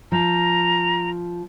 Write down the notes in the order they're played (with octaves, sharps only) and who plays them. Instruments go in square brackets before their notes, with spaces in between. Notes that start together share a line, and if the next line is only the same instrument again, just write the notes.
[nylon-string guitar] F3 [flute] A#5